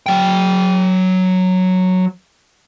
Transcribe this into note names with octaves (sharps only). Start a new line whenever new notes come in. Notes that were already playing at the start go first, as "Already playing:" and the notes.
F#3 G5